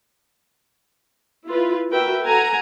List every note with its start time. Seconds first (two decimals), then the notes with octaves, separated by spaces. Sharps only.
1.48 E4 F4 B4
1.90 F#4 A#4 B4 E5 G5
2.24 A4 F#5 G#5 A#5